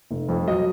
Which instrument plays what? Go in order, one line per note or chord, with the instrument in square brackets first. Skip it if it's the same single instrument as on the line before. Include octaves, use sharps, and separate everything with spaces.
[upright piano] F1
F2
F#3 D#5